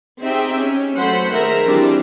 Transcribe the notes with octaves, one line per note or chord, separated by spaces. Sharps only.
C4 D#4 G4 G#4 E5 G5
C#4
F#3 A3 C5 F#5 B5
D#3 G#4 A#4 C5 E5 A#5
E3 F3 G3 C4 D4 E4